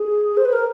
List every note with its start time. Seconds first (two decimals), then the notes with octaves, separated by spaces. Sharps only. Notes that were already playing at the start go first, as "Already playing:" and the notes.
Already playing: G#4
0.37 C5
0.45 B4
0.53 A#4